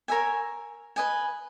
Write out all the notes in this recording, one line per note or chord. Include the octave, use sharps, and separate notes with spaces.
A#4 C#5 E5 G#5
B4 D#5 G#5